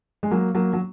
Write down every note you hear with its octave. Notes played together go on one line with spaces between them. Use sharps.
G#3
F#3 A#3
F#3 A#3
F#3